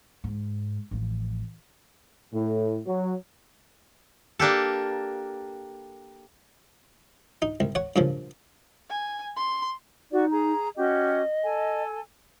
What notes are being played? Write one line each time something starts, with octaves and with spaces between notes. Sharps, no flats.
G#2
A1 F3
A2
F#3
A#3 D4 G4 A4
D#4
C2
C#5 F#5
G2 A#2 C#3 F3
G#5
C6
D#4 F#4 D5
G#4 A#5
C#4 F#4 G4 D#5
A4 G#5